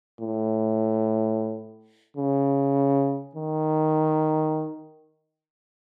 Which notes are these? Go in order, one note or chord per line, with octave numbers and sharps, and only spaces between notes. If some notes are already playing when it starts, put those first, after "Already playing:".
A2
C#3
D#3